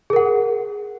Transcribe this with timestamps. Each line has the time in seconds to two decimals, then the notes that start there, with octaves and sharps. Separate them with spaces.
0.10 G#4
0.13 A#4
0.16 F#5